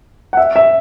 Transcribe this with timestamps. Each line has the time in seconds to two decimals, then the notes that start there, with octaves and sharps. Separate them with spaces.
0.33 F#5
0.37 E5
0.56 E5